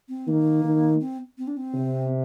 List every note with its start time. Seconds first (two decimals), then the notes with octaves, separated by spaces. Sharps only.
0.08 C4
0.27 D#3 A#3
0.64 D#3
1.00 C4
1.38 C4
1.47 D4
1.57 C4
1.74 C3